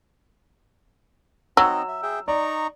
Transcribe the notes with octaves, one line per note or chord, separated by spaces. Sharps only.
F#3 C4 D#4 D#5 E6
E5
G#4 E5 G5
D#4 D5 A#5 C#6